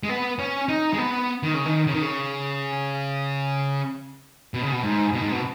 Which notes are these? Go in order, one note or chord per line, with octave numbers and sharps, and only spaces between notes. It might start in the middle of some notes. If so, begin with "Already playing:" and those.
G#3
B3
C#4
D#4
G#3
B3
D#3
C#3
D#3
C#3
D#3
C#3
B2
C#3
B2
G#2
B2
G#2
B2